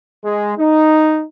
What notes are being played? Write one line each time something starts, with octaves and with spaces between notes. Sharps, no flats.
G#3
D#4